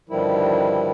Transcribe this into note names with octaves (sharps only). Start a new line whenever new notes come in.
G2 D3 D#3 F3 G3 E4